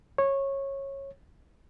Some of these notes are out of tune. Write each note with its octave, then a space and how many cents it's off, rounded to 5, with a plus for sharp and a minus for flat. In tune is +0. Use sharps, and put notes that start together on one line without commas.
C#5 -15